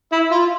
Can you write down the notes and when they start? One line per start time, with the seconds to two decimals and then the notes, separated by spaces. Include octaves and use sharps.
0.12 E4
0.32 F4